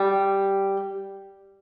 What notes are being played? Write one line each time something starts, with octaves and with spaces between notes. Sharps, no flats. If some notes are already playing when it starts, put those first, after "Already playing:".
Already playing: G3